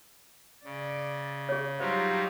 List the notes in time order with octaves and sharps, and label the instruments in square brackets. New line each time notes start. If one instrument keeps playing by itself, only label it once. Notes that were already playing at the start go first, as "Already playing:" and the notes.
[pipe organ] C#3 [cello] D5
[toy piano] G#4 C#5
[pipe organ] F#3 G3 D#4 [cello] F4 G4 [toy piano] C5